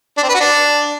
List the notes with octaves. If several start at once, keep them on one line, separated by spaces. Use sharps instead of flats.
D4
C4
B4
F#4
D4